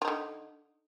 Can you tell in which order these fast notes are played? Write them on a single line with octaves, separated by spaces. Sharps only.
F4 D#4 D3